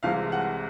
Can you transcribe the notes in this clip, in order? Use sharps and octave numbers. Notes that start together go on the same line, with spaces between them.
C2 C3 E3 G#3 F5
F#5